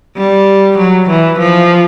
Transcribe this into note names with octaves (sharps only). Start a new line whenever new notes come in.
G3
F#3
E3
F3